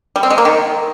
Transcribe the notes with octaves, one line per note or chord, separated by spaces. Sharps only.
G3
C4
G#3
A#3
D#3